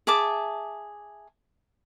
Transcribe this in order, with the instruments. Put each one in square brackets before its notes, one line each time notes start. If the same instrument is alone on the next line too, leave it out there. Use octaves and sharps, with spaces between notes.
[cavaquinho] G#4 E5 A5 D6